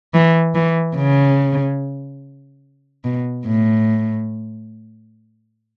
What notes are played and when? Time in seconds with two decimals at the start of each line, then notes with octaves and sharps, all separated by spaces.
0.14 E3
0.55 E3
0.96 C#3
3.04 B2
3.46 A2